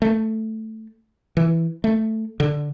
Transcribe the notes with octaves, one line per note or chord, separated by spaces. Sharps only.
A3
E3
A3
D3